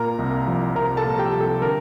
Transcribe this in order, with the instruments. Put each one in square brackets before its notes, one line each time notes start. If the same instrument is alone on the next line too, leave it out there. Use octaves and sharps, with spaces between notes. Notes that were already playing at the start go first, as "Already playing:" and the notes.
Already playing: [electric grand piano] A#2 A#4 A#5
C2
F3
C2 A#4 A#5
A4 A5
A#2
G4 G5
C2
A4
D3 A#4